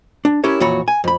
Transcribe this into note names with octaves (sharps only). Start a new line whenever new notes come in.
D4
C#4 E4 G4 A#4 C#5
F2 A#2 E3 F#4 C#5 B5
G#5
F2 B5